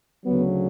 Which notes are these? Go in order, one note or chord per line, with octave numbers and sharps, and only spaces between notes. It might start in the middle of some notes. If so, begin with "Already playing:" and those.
D2 C#3 F#3 B3